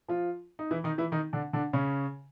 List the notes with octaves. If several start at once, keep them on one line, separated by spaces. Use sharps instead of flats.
F3 F4
D#4
E3 E4
D#3 D#4
E3 E4
D#3 D#4
D3 D4
D3 D4
C#3 C#4